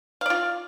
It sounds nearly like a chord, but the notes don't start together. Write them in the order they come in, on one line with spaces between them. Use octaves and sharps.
F5 D5 F4